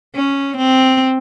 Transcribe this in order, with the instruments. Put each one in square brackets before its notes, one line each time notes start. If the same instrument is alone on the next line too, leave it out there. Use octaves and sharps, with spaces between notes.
[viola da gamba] C#4
C4